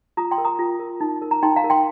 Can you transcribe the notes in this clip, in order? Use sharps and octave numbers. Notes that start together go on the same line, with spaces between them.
F4 A#5 D#6
G5 C6
A#4
A#5 D#6
F4
A#4
D#4
A#4
A#5
D#4 G5 C6
F5 A#5
A#4
G5 C6